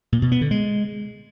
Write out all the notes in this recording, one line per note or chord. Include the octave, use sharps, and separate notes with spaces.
A#2
B2
B3
D3
G#3